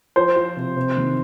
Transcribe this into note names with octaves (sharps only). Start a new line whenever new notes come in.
F3 C5
F3
C3
C3
D#3